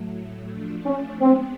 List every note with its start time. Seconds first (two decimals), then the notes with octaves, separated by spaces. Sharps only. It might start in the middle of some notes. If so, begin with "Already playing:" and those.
Already playing: A2 F#3 A3
0.51 F3 A3 D4
0.86 C#4
1.20 G#3 B3 C4 D4